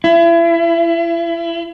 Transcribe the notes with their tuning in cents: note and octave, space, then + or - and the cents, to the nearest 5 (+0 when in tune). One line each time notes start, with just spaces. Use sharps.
E4 +35